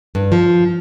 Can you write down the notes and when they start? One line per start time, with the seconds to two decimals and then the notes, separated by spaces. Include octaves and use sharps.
0.15 G2
0.32 F3